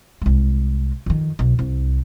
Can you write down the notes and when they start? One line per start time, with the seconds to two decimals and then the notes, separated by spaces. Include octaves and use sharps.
0.22 C2 G#3
1.06 F2 D#3
1.39 B1 B2
1.59 C2